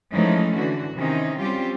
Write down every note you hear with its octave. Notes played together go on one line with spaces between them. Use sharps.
E3 F3 G#3 A3 C#4 D#4
D3 E3 F#4
C3 D#3 E3 C4 C#4 D#4
F#3 G3 C4 C#4 F4 G4